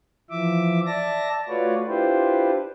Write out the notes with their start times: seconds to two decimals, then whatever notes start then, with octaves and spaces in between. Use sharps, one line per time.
0.30 E3 F3 E5 D6
0.86 D5 E5 A5 A#6
1.49 A3 F4 F#4 B4 C#5 D5
1.87 D4 E4 F4 G4 B4 C5